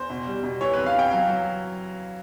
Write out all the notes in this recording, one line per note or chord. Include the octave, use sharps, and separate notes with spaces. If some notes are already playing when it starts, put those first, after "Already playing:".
Already playing: E2 C5
B2
G3
B2
E3 C#5
F2 B4
F5
E3 G5
F#3 F5
F#3